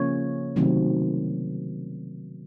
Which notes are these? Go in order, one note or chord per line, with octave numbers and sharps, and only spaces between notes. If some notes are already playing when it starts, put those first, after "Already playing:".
Already playing: C#3 F3 A#3 C#4 C#5
C3 D#3 F#3 A3 C4